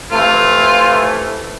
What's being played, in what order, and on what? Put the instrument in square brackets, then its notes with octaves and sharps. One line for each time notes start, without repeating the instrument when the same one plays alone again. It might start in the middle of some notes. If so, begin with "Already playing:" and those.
[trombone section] C3 E3 A3 [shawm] F4